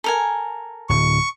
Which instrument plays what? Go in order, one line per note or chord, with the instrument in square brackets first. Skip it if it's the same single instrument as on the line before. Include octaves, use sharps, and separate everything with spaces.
[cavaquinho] A4 A#4 G#5
[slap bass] D1 [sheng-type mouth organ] C#6